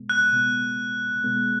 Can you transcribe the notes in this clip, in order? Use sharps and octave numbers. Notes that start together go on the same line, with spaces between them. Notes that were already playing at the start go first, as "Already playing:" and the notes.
Already playing: B2 G#3 B3
F#6
B2 G#3 B3
B2 G#3 B3